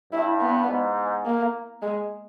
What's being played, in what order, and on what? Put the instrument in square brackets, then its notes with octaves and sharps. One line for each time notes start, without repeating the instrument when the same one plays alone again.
[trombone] G2 [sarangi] E4
[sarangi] B3
[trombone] G#2
[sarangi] A#3
G#3